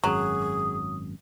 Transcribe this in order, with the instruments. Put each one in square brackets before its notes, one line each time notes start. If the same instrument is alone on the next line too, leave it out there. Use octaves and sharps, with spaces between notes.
[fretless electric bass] G#1 F#2 [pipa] F#3 [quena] G#4
[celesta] D#6